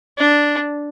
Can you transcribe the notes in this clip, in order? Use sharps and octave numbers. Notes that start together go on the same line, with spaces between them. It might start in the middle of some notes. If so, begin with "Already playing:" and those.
D4